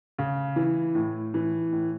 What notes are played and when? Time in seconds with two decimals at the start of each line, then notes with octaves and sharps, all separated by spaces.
0.18 C#3
0.56 E3
0.95 A2
1.34 E3
1.72 A2